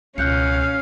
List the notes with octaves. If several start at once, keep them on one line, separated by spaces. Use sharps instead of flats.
C#2 B2 C#4 F5 F#6 G6 C#7